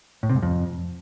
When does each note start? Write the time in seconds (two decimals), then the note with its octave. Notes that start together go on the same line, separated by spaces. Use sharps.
0.23 A2
0.29 C3
0.36 G#2
0.42 F2